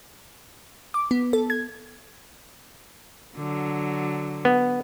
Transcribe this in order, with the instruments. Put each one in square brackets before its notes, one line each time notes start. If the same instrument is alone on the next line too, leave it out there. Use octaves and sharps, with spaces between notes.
[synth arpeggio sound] D6
B3
A4
G#6
[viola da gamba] D3 F#3
[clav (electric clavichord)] B3